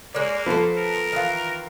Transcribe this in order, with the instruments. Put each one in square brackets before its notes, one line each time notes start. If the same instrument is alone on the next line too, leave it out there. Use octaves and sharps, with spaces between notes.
[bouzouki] G#3 C#5 D5 [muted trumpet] A#3
[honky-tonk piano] F3 B3 A4 [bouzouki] B4 C5
[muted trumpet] A#4
[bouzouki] D#3 E3 F4